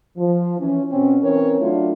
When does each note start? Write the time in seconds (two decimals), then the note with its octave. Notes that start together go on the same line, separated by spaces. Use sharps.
0.18 F3
0.59 E3 C#4
0.91 B2 C4 C#4
1.23 E3 C4 C#4 A#4 C#5
1.61 F#3 A3 D4 E4 F4